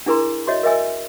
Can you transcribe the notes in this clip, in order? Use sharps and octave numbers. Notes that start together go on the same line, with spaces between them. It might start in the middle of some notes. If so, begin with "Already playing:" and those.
D4 E4 G#4 A#4 A#5 C6
F#4 C#5 D#5 E5 C6
A#4 D#5 E5 G#5 E6